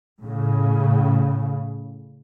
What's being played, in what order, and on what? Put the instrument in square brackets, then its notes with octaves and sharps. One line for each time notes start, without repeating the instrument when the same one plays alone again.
[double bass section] A2 C#3